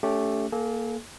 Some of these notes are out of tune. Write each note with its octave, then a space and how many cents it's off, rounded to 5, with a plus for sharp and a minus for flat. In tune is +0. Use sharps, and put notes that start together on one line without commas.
A3 +0 C#4 +35 G4 +0
A#3 +0 A4 -40 G#5 -35